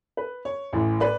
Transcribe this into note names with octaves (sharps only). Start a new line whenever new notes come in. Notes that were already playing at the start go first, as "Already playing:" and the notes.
B4
C#5
A1 A2 E3
B4 D5